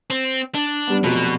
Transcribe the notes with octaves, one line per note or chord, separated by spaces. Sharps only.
C4
D4
G2 G3 B3
F1 F2 B2 F#3